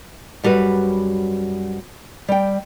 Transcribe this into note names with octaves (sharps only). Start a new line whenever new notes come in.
F#2 G3 F#4 B4
G3 G5